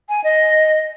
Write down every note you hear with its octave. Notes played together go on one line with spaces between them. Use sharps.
G#5
D#5